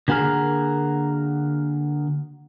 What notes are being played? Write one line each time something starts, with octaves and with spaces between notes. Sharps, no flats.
D3 A#3 F#4 G#4 A#4